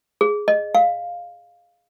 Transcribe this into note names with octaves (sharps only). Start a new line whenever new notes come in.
G#4
D#5
F5